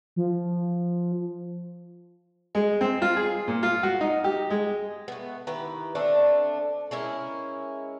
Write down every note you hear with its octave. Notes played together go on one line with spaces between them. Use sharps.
F3
G#3
C4
F4
G#4
A#2
F4
F#4
D#4
G4
G#3
A3 B3
D#3 E4 G4 B4
D3 A3 C4 D4
G#3 C#4 E4 A#4